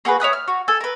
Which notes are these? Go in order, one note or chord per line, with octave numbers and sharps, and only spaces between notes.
A#3 F#4 G#4 B4
C#5 E5 D#6 F#6
F6
F#4
A4 G#5
A#4 B4